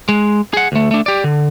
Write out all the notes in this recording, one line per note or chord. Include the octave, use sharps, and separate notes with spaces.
G#3
G#4 F#5
D2 A3
A3 D4
G4 D5
D3